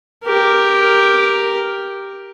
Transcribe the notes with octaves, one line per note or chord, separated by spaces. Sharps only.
G4 A#4